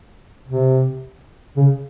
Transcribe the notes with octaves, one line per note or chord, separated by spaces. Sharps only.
C3
C#3